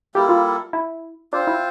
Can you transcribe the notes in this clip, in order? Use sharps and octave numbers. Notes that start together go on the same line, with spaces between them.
G3 A#3 E4 G4 A4
F4
E4
C4 D4 F4 C5
E4